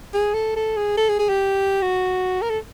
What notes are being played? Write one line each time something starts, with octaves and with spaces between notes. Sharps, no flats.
G#4
A4
A4
G#4
A4
G#4
G#4
G4
F#4
A#4
A4